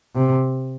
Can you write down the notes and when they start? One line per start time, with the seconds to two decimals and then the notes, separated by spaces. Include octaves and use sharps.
0.15 C3